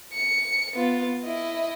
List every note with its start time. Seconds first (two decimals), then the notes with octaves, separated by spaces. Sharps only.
0.14 C#7
0.74 B3 F4
1.24 E4 D#5